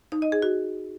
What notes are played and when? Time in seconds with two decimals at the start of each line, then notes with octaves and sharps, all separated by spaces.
0.12 D#4
0.22 D#5
0.32 G#4
0.42 F#4